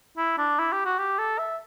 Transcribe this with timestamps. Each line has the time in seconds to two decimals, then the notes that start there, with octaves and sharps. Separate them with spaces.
0.18 E4
0.38 D4
0.59 E4
0.73 G4
0.86 F#4
0.99 G4
1.19 A4
1.39 E5